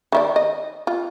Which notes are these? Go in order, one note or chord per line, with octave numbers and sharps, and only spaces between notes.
D#3 E4 D5
D#5
F4